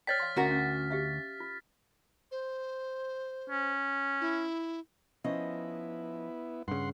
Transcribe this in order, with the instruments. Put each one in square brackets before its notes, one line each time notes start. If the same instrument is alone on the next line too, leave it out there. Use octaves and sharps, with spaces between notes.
[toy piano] C#5 D5 G5 [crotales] F6 A6 B6
[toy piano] F5 C6
[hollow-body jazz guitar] D2 F#4 A#4 [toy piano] C#4 F#5
[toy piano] C#4
G4 E5 F5
F4
[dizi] C5
[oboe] C#4
[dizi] E4
[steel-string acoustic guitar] F3 C#4 D#5 [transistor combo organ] B3 E4
[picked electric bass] G2 C#3 [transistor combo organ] F#5 C6